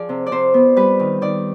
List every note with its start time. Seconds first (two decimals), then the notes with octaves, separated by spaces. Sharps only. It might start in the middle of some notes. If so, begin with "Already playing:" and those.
Already playing: F3 F4 G#4 D5
0.09 C3
0.26 D5
0.32 C3 C5
0.54 B3
0.76 G3 B4
1.00 D#3
1.22 D#3 D5